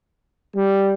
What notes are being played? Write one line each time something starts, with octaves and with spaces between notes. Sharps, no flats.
G3